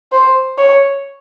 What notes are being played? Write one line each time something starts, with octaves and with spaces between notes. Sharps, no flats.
C5
C#5